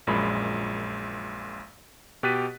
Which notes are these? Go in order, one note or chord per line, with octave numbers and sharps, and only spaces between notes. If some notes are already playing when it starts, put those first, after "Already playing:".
A#1 F#2 A#2 G#3 B5
B2 G4 F#6 A6 B6 D#7